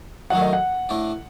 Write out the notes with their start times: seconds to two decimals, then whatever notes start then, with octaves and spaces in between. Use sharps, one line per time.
0.30 F#2 D#3 F#3 A3 F#5
0.42 D#5
0.53 F#5
0.89 A2 A3 D4